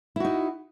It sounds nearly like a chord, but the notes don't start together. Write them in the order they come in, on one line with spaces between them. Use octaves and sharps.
E4 F#4 D#4